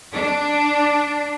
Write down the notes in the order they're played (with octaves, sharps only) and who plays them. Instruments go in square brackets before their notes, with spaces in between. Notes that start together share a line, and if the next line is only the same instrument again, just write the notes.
[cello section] D4